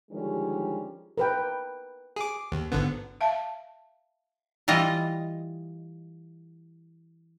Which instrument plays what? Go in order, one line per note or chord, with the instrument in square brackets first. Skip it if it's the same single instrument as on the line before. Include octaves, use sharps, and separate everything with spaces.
[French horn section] D3 D#3 F3 G3 G#3 C#4
[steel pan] A#4 B4 G5
[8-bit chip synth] G#4 D6
D#2
G#1 D3 B3
[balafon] E5 F5 A5
[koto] E3 G3 F4 D#5